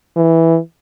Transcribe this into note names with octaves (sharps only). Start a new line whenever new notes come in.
E3